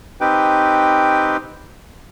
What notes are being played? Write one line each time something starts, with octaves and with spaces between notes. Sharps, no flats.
C4 D#4 G4 B4 G5